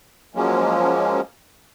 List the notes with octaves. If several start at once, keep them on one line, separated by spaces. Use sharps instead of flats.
F3 F#3 G#3 A#3 C#4